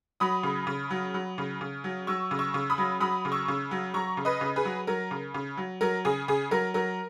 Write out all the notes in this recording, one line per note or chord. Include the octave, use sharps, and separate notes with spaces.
F#3 B5 D#6
C#3
C#3
F#3
F#3
C#3
C#3
F#3
F#3 C#6 E6
C#3
C#6 E6
C#3
B5 D#6
F#3
F#3 B5 D#6
C#3
C#6 E6
C#3
F#3
F#3 A#5 C#6
C#3
B4 D#5
C#3
G#4 B4
F#3
F#3 A#4
C#3
C#3
F#3
F#3 A#4
C#3 G#4
C#3 G#4
F#3 A#4
F#3 A#4